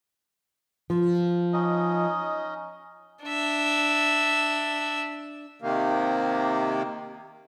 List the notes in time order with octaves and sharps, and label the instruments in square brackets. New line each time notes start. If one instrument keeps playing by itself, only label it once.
[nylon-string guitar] F3
[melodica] C#4 D#4 D#5
[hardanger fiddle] D4 E5
[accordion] C3 D#3 A#3